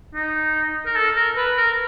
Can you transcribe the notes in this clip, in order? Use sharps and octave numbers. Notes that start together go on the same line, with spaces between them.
D#4
A#4
A4
A#4
B4
A#4